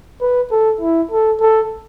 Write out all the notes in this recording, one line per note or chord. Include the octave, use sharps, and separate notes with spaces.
B4
A4
E4
A4
A4